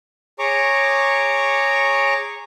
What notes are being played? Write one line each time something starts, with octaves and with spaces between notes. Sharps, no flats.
G#4 C#5 A#5 C#6 D6